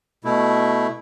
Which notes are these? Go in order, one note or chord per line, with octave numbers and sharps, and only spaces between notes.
B2 A3 E4